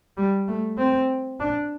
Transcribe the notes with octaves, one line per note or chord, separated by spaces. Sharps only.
G3
A3
C4
D4